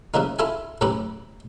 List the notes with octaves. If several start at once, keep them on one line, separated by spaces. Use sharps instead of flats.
C#3 E3 F3 G3 A#3 D#4
E4 F4 A4 E5 G#5
F#2 A2 C#4 G4 B4 A#5